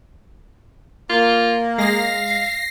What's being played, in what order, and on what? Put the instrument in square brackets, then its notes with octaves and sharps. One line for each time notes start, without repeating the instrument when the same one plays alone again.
[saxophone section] A#3 [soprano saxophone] F4
[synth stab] G#3 [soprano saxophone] F5 [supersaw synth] A#6 C7